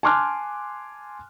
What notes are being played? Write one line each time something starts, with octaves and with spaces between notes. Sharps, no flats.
G#5 A5 C6 D6 F6 F#6